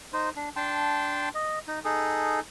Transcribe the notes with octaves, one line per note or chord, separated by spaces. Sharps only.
D#4 C5
D4
D4 G5 A5 C6
D#5
D#4
D#4 G#4 A4